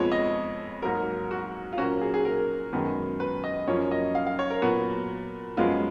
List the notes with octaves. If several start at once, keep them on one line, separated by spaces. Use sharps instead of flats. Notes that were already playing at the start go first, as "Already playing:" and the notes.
Already playing: F2 F3 G#3 B3 C#5
D#5
G#2 F#3 A#3 A#4
F#4
F4
A#2 F#3 A#3 C#4 F#4
G#4
G#4
A#4
F#2 D#3 G#3 B3
B4
D#5
F#2 F3 A#3 C#4 C#5
D#5
F5
F5
C#5
A#4
A#2 F#3 B3 F#4
F#2 F3 G#3 B3 F4